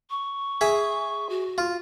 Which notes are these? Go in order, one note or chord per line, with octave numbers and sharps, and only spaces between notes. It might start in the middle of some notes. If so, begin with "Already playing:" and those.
C#6
G#4 E5
F#4
F4